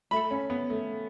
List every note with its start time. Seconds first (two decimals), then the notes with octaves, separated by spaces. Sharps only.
0.11 A3 A4 E5 B5
0.31 C#4
0.50 B3
0.70 A3